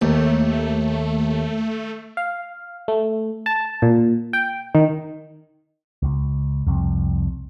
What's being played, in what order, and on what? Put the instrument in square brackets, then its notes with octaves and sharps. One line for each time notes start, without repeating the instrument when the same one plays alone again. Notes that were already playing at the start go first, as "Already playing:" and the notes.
[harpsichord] D#2 [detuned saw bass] A3
[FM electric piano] F5
A3
A5
A#2
G5
D#3
[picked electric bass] C#2
C2 F2